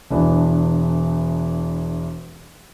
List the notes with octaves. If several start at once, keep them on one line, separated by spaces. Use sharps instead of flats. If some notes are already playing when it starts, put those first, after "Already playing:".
E1 E3 B3 D4